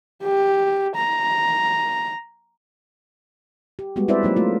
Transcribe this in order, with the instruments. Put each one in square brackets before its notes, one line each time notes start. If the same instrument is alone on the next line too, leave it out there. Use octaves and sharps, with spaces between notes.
[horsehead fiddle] G4
A#5
[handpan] G4
G3 G#3 B3 F#4
C4 E4 B4 C5 D5 E5
F#3 A#3 D#4
A3 F4